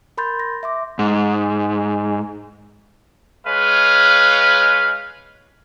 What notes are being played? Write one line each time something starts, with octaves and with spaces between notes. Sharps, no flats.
A#4 B5 C6 G6 A6
A#6
E5 C6 D6
G#2
G#3 B4 C#5 F5